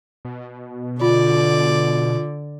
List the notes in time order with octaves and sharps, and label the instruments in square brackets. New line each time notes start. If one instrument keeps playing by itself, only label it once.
[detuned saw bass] B2
[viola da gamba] D3 [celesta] F4 [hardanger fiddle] D5